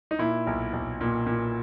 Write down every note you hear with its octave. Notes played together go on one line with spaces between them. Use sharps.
D#4
A#2 E4
B1
B1
A#2
A#2